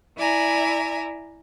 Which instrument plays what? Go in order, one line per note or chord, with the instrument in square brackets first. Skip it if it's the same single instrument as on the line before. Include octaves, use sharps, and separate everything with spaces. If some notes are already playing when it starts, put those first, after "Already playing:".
[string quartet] E4 D5 E5 G#5 A#5